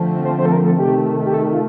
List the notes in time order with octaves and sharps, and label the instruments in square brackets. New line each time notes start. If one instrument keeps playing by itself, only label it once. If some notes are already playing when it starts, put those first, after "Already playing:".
Already playing: [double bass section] D3 F3 A3 C4
[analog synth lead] C5
C5
A4
A#4
A4
[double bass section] C3 D#3 A3 [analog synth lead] G4
[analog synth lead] G4
A4
F4